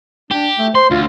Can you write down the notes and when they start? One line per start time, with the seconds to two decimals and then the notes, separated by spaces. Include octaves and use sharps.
0.31 D4 G4
0.58 A3
0.75 C5 C6
0.91 D2 F4